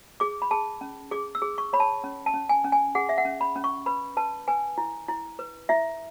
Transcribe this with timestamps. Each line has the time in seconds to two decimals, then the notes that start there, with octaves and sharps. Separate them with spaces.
0.20 G#4 D6
0.42 B5
0.51 G#4 A5
0.81 C#4
1.11 G#4 D6
1.35 E6
1.42 G#4
1.58 C#6
1.73 C#5 B5
1.80 A5
2.04 C#4
2.26 A5
2.34 C#4
2.49 G#5
2.64 C#4
2.72 G#5
2.95 G#4 F#5
3.09 E5
3.18 F#5
3.25 C#4
3.41 B5
3.56 C#4
3.64 C#6
3.86 B4 B5
4.17 B4 A5
4.48 B4 G#5
4.78 E4
5.08 E4
5.39 B4
5.69 E4 E5